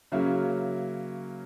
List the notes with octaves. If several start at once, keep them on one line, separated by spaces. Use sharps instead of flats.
C#3 F#3 A#3 C#4 E4